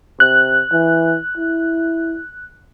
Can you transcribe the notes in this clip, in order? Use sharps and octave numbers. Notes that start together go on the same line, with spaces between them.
C3 F#6
E3
E4